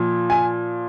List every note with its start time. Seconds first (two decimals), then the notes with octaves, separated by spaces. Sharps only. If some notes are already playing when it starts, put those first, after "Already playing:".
Already playing: A#2 F3
0.30 G#5